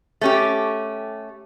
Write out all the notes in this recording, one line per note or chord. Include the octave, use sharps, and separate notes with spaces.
A3 C#4 G4